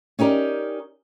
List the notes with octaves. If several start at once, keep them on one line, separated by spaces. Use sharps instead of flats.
C#4 D#4 G4 A#4 D5